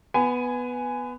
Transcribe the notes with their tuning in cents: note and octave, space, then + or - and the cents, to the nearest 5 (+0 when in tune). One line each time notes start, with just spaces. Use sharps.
B3 +0 G#5 +0 B5 +35